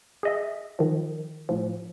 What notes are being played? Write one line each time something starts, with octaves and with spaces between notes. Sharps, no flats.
G#4 D#5 E5
D#3 F3
A2 F3